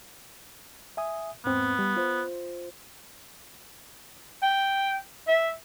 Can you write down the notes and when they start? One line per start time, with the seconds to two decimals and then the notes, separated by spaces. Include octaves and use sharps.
0.97 E5 G#5 D#6
1.45 E2 G#2 B3 C4
1.79 G3
1.96 F4 C5
4.42 G5
5.28 E5